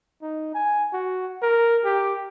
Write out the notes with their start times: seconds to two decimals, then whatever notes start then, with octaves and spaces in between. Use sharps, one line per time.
0.22 D#4
0.54 G#5
0.93 F#4
1.42 A#4
1.85 G4